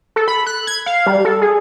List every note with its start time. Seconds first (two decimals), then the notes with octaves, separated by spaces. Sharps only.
0.16 A4
0.28 B5
0.47 F#6
0.67 G#6
0.86 F5
1.06 G3
1.25 A4
1.41 G#4